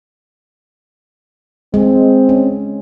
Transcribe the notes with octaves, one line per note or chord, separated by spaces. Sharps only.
G#3 C4
C#4